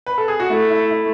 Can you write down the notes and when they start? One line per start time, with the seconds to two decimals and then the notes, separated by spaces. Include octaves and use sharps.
0.06 B4
0.18 A4
0.28 G#4
0.40 F#4
0.49 A3 E4
0.70 E4
0.91 E4